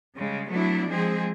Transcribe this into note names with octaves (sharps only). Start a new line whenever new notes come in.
C#3 G3 G#3
F#3 A3 B3 D4 E4
F3 G#3 C4 G#4